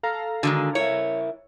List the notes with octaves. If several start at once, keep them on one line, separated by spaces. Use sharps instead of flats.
A4 F5 A#5
D3 D#3 G#3 F#4
E4 A#4 C#5 E5